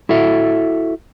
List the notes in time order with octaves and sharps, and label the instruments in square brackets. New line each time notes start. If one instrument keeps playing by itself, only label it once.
[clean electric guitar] E4 F#4 A4 E5